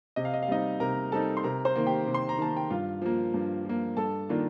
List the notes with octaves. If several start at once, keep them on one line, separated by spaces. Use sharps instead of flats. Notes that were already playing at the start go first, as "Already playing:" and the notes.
C3 D#5
F5
D#5
F5
G3 C4 D#4 D#5
C3 A#4 A#5
G3 C4 D#4 A4 A5
C6
C3 A#4 A#5
C5 C6
D#3 A#3
G4 G5
C3
C6
A#5
D#3 A#3 A5
G5
G2 F4 F5
F3 A#3
G2
F3 A#3
G2 A4 A5
D#3 A#3 D4 F4